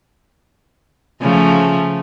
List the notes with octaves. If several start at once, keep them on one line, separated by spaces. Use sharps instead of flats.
C#3 F3 A3